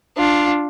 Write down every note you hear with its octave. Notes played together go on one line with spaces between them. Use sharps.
D4 F4